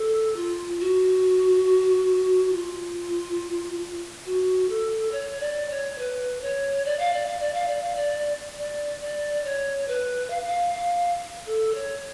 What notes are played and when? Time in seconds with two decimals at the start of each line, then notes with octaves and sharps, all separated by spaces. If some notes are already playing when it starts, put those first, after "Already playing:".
Already playing: A4
0.36 F4
0.80 F#4
2.53 F4
4.26 F#4
4.69 A4
5.12 C#5
5.40 D5
5.70 C#5
5.98 B4
6.42 C#5
6.86 D5
6.99 F5
7.13 D5
7.27 F5
7.40 D5
7.54 F5
7.68 D5
7.82 F5
7.96 D5
8.58 D5
9.00 D5
9.44 C#5
9.88 B4
10.30 F5
10.46 F5
10.74 F5
11.46 A4
11.75 C#5